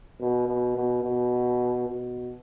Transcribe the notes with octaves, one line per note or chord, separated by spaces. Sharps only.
B2
B2
B2
B2
B2